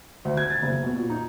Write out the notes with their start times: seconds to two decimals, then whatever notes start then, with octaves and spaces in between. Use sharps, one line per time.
0.25 D2
0.37 G#6
0.50 A6
0.62 F#1
0.83 B2
0.96 A#2
1.10 D#4